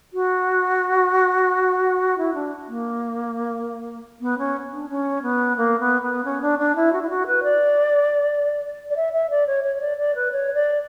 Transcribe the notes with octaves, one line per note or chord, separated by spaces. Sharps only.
F#4
E4
D4
A#3
B3
C#4
D4
C#4
B3
A#3
B3
B3
C#4
D4
D4
E4
F#4
E4
F#4
B4
D5
D5
E5
E5
D5
C#5
C#5
C#5
D5
D5
B4
C#5
D5